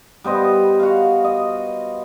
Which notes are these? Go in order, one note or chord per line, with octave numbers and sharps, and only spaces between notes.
G3 B3 C5 D#5
F#4 F5
D#5